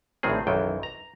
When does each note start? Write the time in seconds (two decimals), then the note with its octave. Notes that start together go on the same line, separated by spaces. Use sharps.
0.23 A#1 A2 D#3 C4 G#4
0.47 B1 F#2 D#3 E3 G5
0.83 A#5